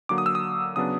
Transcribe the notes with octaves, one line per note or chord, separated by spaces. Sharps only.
D3 F#3 A#3 D6
D#6
E6
D#6
C#3 F#3 B3 D4 D#6